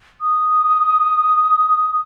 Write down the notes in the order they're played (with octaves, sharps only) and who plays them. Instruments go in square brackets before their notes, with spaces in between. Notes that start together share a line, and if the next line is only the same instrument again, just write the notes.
[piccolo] D#6